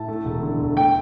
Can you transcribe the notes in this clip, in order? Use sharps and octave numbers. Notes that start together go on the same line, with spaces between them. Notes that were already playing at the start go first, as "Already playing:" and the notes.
Already playing: A2 A5
A3
E1
D3
D2
A3 G5